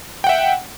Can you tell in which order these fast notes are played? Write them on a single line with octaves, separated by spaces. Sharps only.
G5 F#5 E5